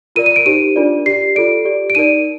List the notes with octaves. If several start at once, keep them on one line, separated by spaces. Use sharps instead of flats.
F4 A#4 D5 D#7
D#7
D7
D#4 G4 C5 D#7
D4 F4 A#4 D5
G4 D5 C7
F4 A4 D5 D7
G4 D5
D7
D#4 A#4 D5 D#7